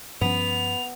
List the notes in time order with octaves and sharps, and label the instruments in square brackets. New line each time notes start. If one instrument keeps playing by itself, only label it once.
[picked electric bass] G2 F3 C#4 [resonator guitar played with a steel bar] B3 [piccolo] F7